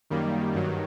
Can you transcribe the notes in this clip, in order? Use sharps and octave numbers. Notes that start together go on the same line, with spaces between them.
F#2 D#3 G3 A#3
G2 D#3 F#3